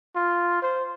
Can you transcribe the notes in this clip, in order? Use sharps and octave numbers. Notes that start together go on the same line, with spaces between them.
F4
C5